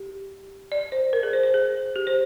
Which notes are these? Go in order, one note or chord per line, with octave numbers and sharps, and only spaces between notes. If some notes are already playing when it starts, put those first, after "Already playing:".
Already playing: G4
D5
C5
A#4
G#4
C5
C5
G#4
G4
C5